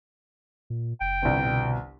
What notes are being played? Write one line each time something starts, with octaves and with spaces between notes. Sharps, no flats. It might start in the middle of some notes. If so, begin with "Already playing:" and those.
A#2
F#1 G5
G1 C2
B2